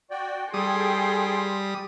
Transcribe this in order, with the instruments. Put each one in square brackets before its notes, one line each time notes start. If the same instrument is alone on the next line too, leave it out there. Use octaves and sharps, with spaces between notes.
[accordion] F#4 D5 G5
[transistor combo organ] G3 D#6 [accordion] G#4 A4 G5 [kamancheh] G#5 C6